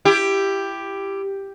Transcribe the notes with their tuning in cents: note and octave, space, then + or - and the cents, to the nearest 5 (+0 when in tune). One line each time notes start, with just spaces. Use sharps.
E4 +30 G4 +5